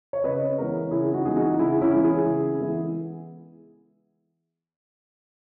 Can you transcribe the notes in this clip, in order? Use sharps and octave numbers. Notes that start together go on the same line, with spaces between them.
C#5
C#3 B4 D#5
E3 G#3 B3 A#4 C#5
C#3 E4 G#4
D#4 F#4
E3 G#3 B3 G#4
D#4 F#4
C#3 E4 G#4
C#4 E4
E3 G#3 B3
E4 G#4
C#3
E3 G#3 B3